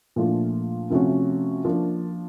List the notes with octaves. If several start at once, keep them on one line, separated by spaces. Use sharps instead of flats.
A#2 F3 A3 D4 F4
C3 F3 A3 C#4 F#4
F3 A#3 D4